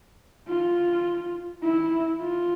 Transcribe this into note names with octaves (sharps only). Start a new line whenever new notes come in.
F4
E4
F4